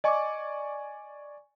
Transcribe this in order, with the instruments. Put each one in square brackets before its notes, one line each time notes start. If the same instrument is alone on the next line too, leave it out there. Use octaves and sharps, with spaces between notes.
[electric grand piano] D5 G#5 C#6 [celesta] D#5 D6